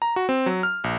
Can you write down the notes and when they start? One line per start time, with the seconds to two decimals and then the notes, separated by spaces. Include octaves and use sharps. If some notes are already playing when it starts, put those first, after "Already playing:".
0.02 A#5
0.16 F#4
0.29 C4
0.46 F#3
0.63 F6
0.84 A#1